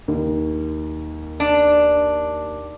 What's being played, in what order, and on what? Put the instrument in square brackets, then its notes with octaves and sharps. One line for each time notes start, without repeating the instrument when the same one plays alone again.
[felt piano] D#2
[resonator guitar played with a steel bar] D4